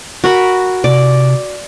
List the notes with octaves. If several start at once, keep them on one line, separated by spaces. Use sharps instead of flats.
F#4 A#4 B5
C3 D5